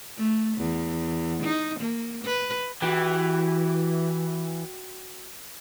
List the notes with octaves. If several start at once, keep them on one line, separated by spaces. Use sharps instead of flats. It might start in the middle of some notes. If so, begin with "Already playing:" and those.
A3
E2
D#4
A#3
B4
E3 F#4 G4